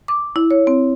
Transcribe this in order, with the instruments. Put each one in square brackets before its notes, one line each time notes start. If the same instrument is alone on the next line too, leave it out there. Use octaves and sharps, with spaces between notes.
[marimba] D6
E4
C#5
C4